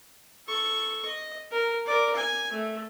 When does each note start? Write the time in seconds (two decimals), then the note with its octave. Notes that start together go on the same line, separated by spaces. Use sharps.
0.47 A4 C#6
1.05 D#5
1.51 A#4
1.86 A#4 D5
2.16 G#5
2.51 A3